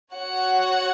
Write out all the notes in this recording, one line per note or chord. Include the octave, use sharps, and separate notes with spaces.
F#4 C#5 F#5